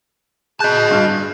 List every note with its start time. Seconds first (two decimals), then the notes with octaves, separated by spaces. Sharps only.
0.60 G#4 D#5 A5 F#6 G6
0.91 G2 F6